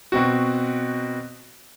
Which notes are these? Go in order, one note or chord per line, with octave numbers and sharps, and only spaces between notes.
B2 C4 F#4